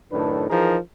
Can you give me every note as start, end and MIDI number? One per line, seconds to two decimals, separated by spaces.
0.12 0.47 42
0.12 0.47 45
0.12 0.47 51
0.12 0.47 62
0.12 0.47 69
0.12 0.47 71
0.50 0.77 52
0.50 0.77 53
0.50 0.77 63
0.50 0.77 68
0.50 0.77 70